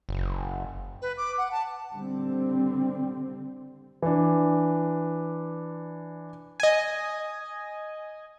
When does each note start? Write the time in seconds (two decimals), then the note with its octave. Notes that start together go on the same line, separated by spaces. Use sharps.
0.09 F#1
1.01 B4
1.17 D6
1.37 F#5
1.51 A5
1.92 D3 G3 C4
4.02 E3 D4
6.60 D#5 G#5